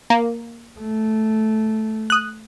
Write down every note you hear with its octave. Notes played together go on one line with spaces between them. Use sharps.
A#3
A3
D#6 F#6